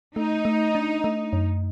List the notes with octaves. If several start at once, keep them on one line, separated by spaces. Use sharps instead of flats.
A3 D#4
A3
D4
A3
F#2